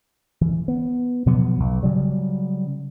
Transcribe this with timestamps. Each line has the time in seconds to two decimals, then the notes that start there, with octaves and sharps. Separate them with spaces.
0.41 E3
0.68 B3
1.26 B2 F3 F#3 B3
1.60 B1
1.83 C#3 F#3 G3